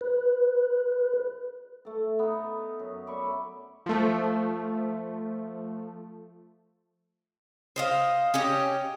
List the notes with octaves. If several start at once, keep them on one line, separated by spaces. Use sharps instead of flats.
B4
A3 A4
B3 D#4
F#2
D5 E5 B5 C#6
F3 A3
C5 D#5 F5
C#4 G4 D#5